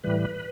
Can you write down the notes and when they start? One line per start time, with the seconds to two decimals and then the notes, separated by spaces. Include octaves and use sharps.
0.04 A2 E3 G3 B4